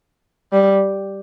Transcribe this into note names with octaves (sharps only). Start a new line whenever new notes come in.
G3